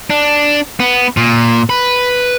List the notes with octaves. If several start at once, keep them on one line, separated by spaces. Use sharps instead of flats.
D4
B3
A#2
B4